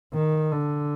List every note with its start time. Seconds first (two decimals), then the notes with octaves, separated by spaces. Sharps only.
0.14 D#3
0.52 D3